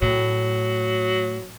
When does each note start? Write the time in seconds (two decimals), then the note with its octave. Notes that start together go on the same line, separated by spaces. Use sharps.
0.02 A2 F#3